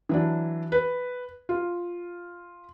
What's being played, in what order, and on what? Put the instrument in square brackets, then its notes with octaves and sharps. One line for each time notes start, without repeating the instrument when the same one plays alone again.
[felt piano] E3 F#3 D4
B4
F4